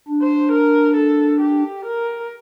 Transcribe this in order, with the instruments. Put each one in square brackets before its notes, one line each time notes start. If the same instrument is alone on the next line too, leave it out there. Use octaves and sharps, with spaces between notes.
[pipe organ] D4
[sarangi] C5
A#4
A4
G4
A#4